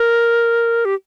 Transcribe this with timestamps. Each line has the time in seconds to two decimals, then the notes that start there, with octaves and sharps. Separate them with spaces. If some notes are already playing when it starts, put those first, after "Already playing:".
Already playing: A#4
0.85 G4